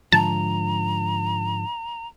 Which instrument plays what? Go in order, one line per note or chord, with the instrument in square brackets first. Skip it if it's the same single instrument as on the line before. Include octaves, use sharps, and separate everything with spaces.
[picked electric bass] G#2 D3 F3 [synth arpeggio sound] A5 [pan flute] A#5